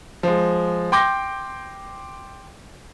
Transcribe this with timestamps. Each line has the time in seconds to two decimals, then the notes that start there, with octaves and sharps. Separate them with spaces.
0.23 F3 G#3
0.92 G5 C6 D6 G6 A#6 D7